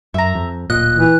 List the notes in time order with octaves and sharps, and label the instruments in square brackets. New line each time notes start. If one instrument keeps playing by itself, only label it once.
[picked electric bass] F#2 [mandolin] E5 A#5
[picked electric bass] F2
[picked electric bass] D1 A#2 [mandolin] D#5 [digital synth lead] F#6
[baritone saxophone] E3